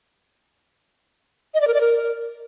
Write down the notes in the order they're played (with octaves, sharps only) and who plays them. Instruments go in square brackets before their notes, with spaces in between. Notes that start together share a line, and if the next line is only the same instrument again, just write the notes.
[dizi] D#5
D5
A#4
D5
A#4